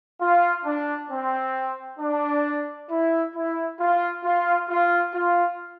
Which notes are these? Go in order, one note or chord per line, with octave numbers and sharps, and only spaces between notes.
F4
D4
C4
D4
E4
E4
F4
F4
F4
F4